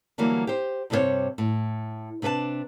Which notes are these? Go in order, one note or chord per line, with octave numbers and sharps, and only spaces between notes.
D3 E3 F#3 G3 A#3
G4 C5
G2 C3 G3 G#4 C5 C#5
A2
C3 D4 B4 C5 A5